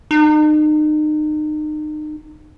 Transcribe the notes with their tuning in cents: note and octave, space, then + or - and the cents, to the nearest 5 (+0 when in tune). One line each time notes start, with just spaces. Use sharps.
D#4 -35